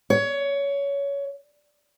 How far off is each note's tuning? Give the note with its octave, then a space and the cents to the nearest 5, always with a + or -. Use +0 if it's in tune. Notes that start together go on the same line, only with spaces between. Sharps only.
C#5 +20